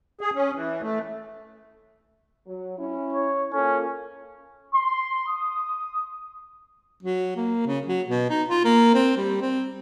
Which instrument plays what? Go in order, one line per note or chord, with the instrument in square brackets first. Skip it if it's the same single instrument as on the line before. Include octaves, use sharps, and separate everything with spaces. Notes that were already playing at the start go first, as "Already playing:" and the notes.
[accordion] G#4
C#4
E3
A3
[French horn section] F#3
C#4 E4
[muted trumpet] C#5
[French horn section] A#3 F4 A4 [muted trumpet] C#4
[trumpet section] C6
D#6
[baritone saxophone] F#3
A#3
C#3
F#3
B2
D#4
F4
A#3
C4
G3
C4